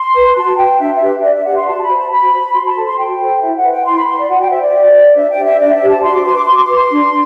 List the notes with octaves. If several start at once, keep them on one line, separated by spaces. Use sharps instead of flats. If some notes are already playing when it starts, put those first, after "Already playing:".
Already playing: C6
B4
F#4 A5
B4 G5
D4 E5
E5
G4 B4
D4 D5
E5
G4 B4 F#5
C6
F#4 A5
B5
C5
A5
F#4 B5
C5
F#4 C6
A5
A4 C5
C6
F#4 G5
A4 C5
E4 E5
F#5
B4
G5
E4 C6
B5
B4 C6
D5
F#4 F#5
G5
C5 E5
D5
F#4
C5
D4 E5
G5
G4 C5
E5
D4 D5
E5
G4 C5
A5
F#4 C6
D6
B4 C6
D6
F#4 C6
D6
B4 C6
D4